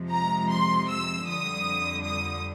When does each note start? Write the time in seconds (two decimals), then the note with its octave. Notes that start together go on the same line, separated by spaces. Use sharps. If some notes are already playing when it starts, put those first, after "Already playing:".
Already playing: F2 C3 F3 G#3
0.10 A#5
0.49 C6
0.88 E6
1.26 F2 D3 G3 D#6
2.04 D#6